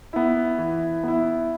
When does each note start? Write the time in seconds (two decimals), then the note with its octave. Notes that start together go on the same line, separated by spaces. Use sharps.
0.13 B3 E4
0.59 E3
1.03 B3 E4